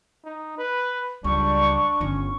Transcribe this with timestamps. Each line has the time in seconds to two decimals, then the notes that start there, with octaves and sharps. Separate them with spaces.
0.24 D#4
0.58 B4
1.24 C#2 F#3 G3 D4 C#6
2.01 G1 D3 C#4